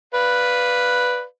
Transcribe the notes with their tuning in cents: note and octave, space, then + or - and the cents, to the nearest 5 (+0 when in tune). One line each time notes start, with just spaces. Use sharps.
B4 +0 D5 +0 F5 +0